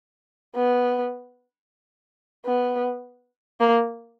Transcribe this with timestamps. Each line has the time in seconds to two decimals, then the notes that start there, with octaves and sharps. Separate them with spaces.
0.55 B3
2.45 B3
3.61 A#3